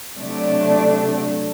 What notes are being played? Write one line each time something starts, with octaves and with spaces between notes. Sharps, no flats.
C3 F#3 A3 D4